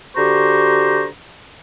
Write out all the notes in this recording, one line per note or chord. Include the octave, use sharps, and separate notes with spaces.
D3 F#4 G4 C5 A#5 C#6